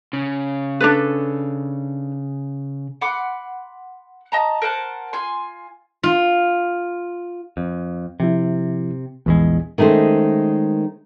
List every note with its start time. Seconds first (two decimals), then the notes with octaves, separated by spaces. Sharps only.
0.13 C#3
0.80 D4 A4 B4
3.01 F#5 B5 C6 D6
4.32 D#5 A5 A#5
4.62 A#4 C5 F#5 A5
5.13 F4 G#5 C6
6.03 F4
7.57 F2
8.20 C3 F3 E4
9.26 A#1 E2 E3 G#3 B3
9.78 D#3 G#3 A3 C#4 C5